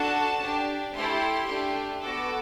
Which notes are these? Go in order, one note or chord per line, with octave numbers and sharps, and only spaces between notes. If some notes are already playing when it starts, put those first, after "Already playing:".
Already playing: D4 F#4 A4 A5
D4 G4
A3 E4 G4 C6
A3 D4 G4
B3 F#4 A4 D6